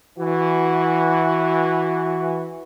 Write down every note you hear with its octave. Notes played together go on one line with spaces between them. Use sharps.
E3 F#4